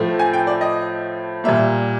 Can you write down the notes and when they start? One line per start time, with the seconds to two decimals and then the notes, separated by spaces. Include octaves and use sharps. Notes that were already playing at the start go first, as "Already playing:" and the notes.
Already playing: A2 F3 A3
0.19 G#5
0.33 G5
0.47 D5
0.61 D#5
1.44 A#2 G3 A#3 E5